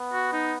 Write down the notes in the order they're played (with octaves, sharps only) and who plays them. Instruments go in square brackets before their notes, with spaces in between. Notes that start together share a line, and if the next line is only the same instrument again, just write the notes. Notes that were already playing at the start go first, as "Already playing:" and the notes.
Already playing: [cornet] B3
[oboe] F#4
D#4